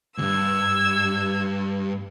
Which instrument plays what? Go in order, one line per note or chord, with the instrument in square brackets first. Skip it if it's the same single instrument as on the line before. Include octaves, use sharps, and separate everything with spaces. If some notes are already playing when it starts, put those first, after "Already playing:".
[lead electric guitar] D2 G2 [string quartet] E6 G#6